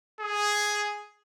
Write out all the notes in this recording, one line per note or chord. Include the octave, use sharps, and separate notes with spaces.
G#4